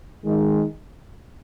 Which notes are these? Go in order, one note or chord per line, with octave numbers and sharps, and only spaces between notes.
D#3 G#3 D#4